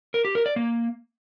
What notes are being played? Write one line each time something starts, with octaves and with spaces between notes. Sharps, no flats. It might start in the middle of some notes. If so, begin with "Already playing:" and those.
A#4
G4
A#4
D5
A#3